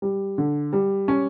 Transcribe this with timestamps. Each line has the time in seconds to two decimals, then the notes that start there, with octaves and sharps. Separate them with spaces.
0.02 G3
0.38 D3
0.73 G3
1.08 C#4